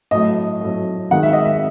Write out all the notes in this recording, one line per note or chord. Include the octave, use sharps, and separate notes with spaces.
A2 F#3 A3 D#5
A2 F#3 A3
D#3 G#3 F#5
E5
D#5
E5